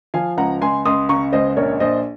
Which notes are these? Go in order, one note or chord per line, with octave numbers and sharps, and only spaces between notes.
F3 F5 G#5
C#2 F#5 A#5
C#2 G#5 C6
C#2 C6 D#6
C#3 A#5 C#6
C#2 C5 D#5
A#1 A#4 C#5
A#1 C5 D#5